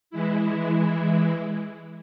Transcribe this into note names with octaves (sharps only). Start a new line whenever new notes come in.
E3 G#3 E4